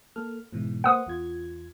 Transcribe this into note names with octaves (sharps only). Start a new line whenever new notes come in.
A#3 A4 F6
G#2 B2 E3
A#3 B4 C5 F#5 D#6
E2 F4 G#6